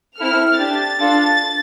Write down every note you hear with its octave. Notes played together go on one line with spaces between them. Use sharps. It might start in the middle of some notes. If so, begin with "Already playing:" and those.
C4 E4 A4 F6
D4 G4 A6
D4 F4 A4